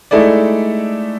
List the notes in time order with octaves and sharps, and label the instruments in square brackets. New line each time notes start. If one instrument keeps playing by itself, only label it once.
[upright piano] G#3 A3 D#4 E4 A4 D5